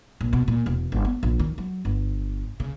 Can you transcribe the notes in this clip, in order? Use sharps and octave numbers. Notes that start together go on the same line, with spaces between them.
A#1
B2
A#2
E1
G1
B3
A#1
D#3
F#3
G1
C#3